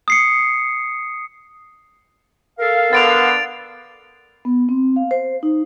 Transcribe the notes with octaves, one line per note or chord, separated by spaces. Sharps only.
D#6 C7 C#7
A4 A#4 F5
D3 B3 A6 D7 F7
B3
C4
F5
C5
D#4